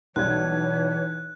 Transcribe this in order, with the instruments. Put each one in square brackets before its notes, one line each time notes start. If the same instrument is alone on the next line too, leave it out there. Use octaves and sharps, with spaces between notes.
[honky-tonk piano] B1 G3 G#6 [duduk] E3 [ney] C#5 [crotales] F#6